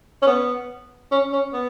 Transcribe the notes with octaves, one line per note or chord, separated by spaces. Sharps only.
C#4
B3
C#4
C#4
B3